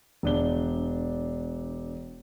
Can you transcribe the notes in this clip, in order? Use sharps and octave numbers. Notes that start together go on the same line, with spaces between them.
E1 D4 G7